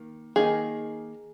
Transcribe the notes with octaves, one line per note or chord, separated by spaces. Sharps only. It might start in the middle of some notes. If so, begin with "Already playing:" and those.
Already playing: D#3 A#3
D#3 A#3 D#4 G#4